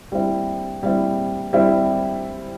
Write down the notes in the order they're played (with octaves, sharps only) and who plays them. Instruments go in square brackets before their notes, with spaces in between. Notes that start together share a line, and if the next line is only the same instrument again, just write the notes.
[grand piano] G3 C4 E4
G3 C4 E4
G3 C4 E4